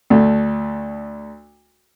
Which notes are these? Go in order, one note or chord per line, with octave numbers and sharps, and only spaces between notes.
D2 A3